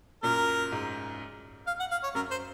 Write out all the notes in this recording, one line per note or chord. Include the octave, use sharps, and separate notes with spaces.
F#2 A#2 A#4
G#2
F5
F#5
F5
C#5
F#2 A#4
C5